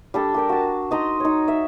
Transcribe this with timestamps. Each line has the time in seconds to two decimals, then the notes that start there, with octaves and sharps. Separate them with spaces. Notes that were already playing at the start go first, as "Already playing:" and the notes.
0.14 G3 D4 A4
0.34 G4 A#4 G5
0.49 F#4 A5
0.91 D#4 D#5 A#5 C6
1.20 D#4 C#5
1.48 E5